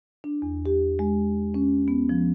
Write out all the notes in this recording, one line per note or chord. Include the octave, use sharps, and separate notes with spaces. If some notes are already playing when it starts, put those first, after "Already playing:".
D4
E2
G4
G#3
C#4
B3
F3